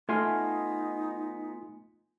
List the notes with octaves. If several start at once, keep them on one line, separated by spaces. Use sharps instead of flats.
A3 B3 D#4 F4 G#5 C6 F6